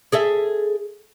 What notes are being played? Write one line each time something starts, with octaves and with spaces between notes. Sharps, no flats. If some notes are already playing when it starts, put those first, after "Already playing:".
G#4 A4 E5